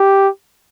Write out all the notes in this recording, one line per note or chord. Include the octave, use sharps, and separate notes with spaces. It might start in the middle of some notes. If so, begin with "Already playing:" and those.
Already playing: G4